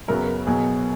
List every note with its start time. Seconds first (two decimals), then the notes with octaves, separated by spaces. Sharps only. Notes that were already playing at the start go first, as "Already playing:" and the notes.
0.08 F#2 C#3 F#3 B3 A#4
0.47 B2 F#3 B3 G#4